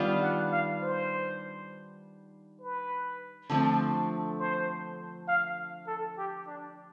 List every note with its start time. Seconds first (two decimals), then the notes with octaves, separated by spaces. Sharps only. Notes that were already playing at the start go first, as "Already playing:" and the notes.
Already playing: D#3 G3 B3 D4 F4
0.22 F#5
0.52 F5
0.81 C5
2.60 B4
3.50 D3 F3 A3 C4
4.39 C5
5.28 F5
5.87 A4
6.17 G4
6.47 D4